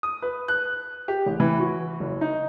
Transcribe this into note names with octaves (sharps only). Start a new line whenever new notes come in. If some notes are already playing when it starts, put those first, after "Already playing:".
D#6
B4
F#6
G4
A1
E3
F#4
F#1
D#4